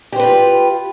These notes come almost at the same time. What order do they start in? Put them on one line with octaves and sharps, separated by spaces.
G4 C5 B4 F4